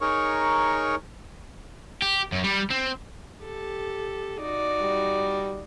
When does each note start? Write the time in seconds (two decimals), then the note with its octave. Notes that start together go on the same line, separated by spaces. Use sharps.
0.01 D#4 G#4 A#4 C#5 C#6
2.02 G4
2.32 F#2
2.44 G3
2.71 C4
3.42 G4 A4
4.41 D#4 F#4 D5
4.81 G3